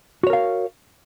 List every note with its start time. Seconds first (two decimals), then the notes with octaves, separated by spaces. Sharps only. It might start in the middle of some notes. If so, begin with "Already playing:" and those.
0.23 F#4
0.27 C#5
0.30 A#4
0.33 F5